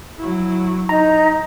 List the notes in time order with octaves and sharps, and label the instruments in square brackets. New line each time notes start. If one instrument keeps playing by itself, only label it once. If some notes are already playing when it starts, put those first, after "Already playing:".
[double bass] F#3 E4
[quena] D#4 [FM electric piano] A#5